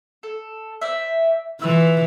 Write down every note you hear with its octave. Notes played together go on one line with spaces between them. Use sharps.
A4
C5 D5 E5
E3 F4 B4 E6